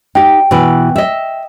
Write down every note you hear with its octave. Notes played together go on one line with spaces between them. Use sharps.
D#4 G4 G5
B2 E3 B4
D#5 E5